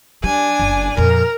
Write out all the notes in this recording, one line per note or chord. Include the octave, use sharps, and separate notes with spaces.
G3 D4 G#5
F#1
F2 A#2 A#4